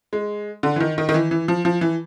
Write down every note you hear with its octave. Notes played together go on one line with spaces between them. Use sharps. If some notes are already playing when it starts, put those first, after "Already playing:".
G#3
D3
E3
D#3
D#3
D#3
E3
E3
F3
F3
E3